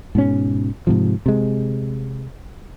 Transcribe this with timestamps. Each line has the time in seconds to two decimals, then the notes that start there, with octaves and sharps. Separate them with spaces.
0.15 G#2 B2 C#4
0.87 G#2 C3 F3
1.26 C3 G#3